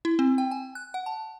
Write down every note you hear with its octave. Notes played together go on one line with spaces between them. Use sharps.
E4
C4
G5
G#5
F#6
F#5
A5